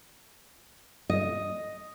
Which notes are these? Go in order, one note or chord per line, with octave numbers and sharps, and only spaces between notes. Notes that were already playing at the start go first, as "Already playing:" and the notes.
D#5